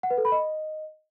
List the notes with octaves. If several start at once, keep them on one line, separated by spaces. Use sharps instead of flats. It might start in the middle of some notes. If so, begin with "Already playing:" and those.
F#5
B4
A4
B5
D#5